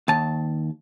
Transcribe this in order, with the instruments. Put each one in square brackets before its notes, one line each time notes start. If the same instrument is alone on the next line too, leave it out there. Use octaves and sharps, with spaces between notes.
[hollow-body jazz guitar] D#2 A5